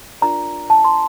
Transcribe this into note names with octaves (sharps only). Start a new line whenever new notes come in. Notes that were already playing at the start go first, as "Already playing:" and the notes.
D4 F4 A#4 D5 A#5
A5
C6